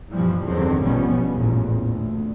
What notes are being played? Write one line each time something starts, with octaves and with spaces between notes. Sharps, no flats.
G2 B2 E3 F3 G3
E2 G2 D3 D#3 F#3 C4
A1 B2 F3 G3 B3 C#4
A1 E2 G2 A#2
D2